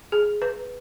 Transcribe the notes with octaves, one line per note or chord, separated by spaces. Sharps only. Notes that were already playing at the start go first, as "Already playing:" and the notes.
G#4
B4